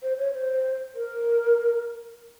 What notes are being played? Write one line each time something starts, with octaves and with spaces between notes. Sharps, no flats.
C5
C#5
C5
A#4